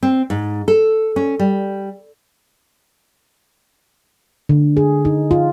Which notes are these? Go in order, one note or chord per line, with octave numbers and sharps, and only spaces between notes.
C4
G#2
A4
C#4
G3
D3
G#4
D#4
F4